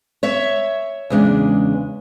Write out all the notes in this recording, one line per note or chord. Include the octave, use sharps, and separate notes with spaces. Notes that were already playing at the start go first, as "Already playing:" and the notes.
C#5 E5
E2 C#3 G#3 D4